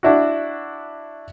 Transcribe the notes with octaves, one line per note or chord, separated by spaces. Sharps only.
D4 E4 F#4